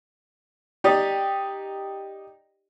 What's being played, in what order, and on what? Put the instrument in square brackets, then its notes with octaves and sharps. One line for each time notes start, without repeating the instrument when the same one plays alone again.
[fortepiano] D#4 G4 D5